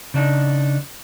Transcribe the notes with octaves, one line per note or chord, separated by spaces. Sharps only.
C#3 D4 D#4